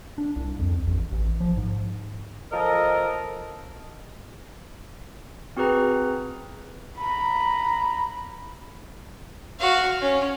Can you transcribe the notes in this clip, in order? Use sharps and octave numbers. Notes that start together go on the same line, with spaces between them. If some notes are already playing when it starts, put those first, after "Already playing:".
D4
C2
F2
A1
A1
F3
G#2
F3 A4 A#4 D#5
C4 F#4 G#4 B4 A#5
A#5 B5
F#4 F5
C#4